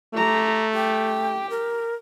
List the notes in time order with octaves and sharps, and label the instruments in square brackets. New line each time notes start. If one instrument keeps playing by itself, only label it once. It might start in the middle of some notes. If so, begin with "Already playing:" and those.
[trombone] A3 [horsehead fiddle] G4 A#5
[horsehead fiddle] G4 [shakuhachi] G5
[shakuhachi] A#4